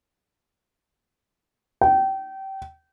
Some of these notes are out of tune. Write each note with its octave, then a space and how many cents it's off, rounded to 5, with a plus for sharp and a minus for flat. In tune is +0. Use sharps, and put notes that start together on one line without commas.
G5 -25